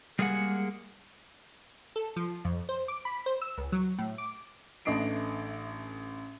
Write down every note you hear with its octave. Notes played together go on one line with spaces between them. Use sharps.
G3 G#3 A#3 G#4 F#5
A4
F3
F2
C5
D6
B5
C5
E6
C#2
F#3
A2
D6
A1 A3 D4 D#5 C7 D7